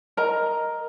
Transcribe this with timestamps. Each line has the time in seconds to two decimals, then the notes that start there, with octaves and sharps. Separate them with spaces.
0.17 A#4 D#5 A#5